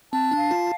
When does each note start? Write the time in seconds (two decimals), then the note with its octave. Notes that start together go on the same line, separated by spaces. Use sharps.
0.12 C4 A5
0.31 D4
0.38 F5
0.51 F4